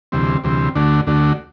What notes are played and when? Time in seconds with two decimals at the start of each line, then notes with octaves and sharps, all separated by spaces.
0.12 D2 C3 E3 G3 C4
0.44 D2 C3 E3 G3 C4
0.75 D2 D3 A3 D4 F#4
1.07 D2 D3 A3 D4 F#4